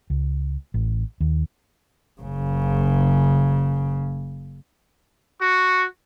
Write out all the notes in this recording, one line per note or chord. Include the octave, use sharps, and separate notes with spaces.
C#2
A1
D#2
F#1 C#3
F#4 C#6